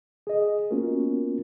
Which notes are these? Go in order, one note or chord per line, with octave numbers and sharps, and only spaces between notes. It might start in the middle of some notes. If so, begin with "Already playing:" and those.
G#4 D#5
A#3 B3 C#4 F4 F#4 A#4